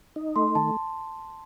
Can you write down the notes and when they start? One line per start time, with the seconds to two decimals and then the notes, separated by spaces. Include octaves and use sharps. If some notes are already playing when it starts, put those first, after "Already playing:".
0.16 D#4
0.36 A3 C6
0.55 D#3 A5